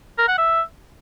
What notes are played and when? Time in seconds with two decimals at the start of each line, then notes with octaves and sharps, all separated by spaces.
0.18 A#4
0.28 F#5
0.38 E5